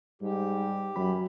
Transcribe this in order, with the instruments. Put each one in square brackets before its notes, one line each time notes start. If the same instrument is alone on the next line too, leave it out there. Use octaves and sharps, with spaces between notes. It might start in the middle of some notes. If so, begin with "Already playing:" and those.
[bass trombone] G#2 [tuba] G3 [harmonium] G4
[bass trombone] F#2 [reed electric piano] F#3 B5